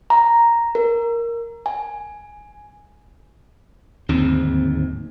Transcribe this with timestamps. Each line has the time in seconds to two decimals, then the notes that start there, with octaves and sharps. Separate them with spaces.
0.10 A#5
0.75 A#4
1.66 G#5
4.08 D1 D#2 G#2 C4